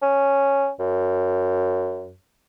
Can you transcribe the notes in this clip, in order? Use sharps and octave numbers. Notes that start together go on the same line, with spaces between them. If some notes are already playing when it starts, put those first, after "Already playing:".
C#4
F#2